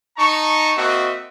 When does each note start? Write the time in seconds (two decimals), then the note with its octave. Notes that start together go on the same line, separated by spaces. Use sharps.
0.17 D#4 A5 A#5 C#6
0.77 A#3 C4 F#4 D#5 E5